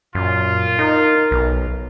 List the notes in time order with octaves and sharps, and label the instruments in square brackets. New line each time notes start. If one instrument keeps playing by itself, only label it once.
[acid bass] F#2 [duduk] A#2 [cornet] F4
[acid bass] D#4 [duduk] A#4
[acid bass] B1